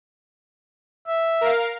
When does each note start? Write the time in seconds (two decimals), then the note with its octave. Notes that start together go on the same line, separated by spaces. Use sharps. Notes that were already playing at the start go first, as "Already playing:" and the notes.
1.06 E5
1.41 A#4 F5